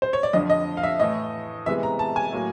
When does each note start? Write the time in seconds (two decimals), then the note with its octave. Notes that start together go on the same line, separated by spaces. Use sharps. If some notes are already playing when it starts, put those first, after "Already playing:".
0.02 C5
0.13 C#5
0.23 D5
0.33 F2 D3 F3 D#5
0.50 D#5
0.77 F5
0.83 E5
1.00 A2 E3 A3 D#5
1.66 C3 E3 G#3 B3 E5
1.83 A#5
1.99 A5
2.16 G#5
2.32 A2 F#3 A#3